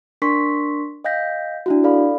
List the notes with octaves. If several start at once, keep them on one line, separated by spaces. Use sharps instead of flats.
D4 A#4 C6 C#6 B6
D#5 F5 G5 G6 A#6 B6
D4 E4 F#4
A4 D5 F5 B5